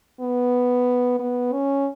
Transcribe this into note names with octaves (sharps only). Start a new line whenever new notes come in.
B3
B3
C#4